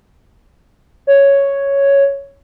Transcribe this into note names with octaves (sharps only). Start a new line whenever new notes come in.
C#5